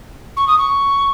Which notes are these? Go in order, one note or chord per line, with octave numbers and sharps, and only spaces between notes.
C#6
D#6
C#6